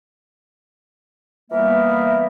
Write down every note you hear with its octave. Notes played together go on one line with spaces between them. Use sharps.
E3 G3 A#3 B3 A#4 E5